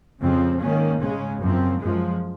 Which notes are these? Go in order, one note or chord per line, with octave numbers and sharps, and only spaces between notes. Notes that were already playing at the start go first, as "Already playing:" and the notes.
F2 C#3 F3 C4
G#2 D#3 A#3 C#4
C#3 G#3 C#4
F#2 F3 C4
F#2 F3 G#3